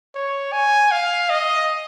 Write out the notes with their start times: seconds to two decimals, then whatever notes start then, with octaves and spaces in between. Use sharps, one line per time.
0.15 C#5
0.52 G#5
0.91 F5
1.30 D#5